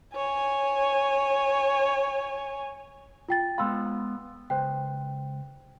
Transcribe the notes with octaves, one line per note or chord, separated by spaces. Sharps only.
C#5 G#5
F4 G5 A6
G#3 B3 F5 B5 C6 E6
C#2 B4 C5 G5